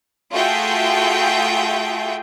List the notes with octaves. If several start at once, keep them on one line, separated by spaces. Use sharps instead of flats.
A3 F4 F#4 G#4 E5 G5